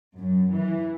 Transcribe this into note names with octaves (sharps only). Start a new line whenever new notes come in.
F#2
E3